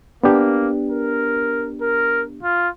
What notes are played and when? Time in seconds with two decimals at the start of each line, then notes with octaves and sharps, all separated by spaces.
0.23 A#3 B3 D4 G4
0.90 A#4
1.81 A#4
2.43 F4